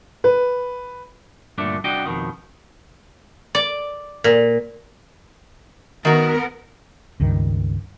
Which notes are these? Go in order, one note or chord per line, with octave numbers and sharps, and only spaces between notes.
B4
G2 A#2 D3 A3 D4
C2 D4 F#4 D#5 G5
F2 B2 D#3
D5
A#2
D#3 B3 F#4 A#4
C#2 G2 D#3